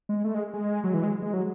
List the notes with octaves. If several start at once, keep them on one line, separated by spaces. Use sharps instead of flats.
G#3
A3
G#3
G#3
F#3
E3
G#3
G#3
F#3